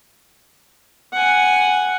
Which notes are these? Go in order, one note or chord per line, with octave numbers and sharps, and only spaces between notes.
F#5 G#5